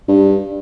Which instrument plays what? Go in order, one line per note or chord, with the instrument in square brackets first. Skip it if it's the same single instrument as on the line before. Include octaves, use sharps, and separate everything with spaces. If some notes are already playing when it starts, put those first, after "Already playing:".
[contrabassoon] G2